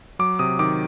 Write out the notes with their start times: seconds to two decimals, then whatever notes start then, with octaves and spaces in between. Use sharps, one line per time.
0.19 F#3 D6
0.39 C3 D#6
0.59 D#3 D6